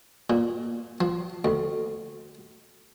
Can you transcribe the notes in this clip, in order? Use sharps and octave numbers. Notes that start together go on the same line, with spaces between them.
A#2
F3
D2